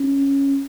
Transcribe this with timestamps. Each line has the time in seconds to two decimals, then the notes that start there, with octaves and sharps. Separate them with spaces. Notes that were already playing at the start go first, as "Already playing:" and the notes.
Already playing: C#4